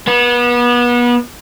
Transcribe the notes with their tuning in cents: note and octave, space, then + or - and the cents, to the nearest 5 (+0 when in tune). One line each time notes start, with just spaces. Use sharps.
B3 -30